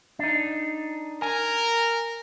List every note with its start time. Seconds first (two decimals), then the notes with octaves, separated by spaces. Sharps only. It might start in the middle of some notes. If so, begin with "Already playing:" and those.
0.19 D4 D#4
1.22 A#4 G#5